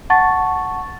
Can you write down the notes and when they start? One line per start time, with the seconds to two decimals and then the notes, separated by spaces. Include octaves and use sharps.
0.10 F#5 A5 C#6 A6